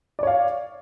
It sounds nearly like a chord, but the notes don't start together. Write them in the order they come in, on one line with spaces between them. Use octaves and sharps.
D5 C#5 F5